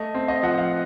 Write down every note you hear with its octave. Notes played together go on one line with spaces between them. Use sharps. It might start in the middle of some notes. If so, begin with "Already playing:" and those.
Already playing: A3 D#5
C4
D#5
F3 F#5
F5